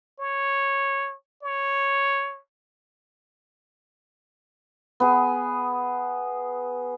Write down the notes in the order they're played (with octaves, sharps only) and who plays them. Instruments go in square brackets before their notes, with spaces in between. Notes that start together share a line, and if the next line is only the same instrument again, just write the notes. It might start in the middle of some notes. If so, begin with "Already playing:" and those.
[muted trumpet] C#5
C#5
[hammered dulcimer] B3 G#4